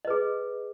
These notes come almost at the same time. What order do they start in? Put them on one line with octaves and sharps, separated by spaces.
D#5 B4 G#4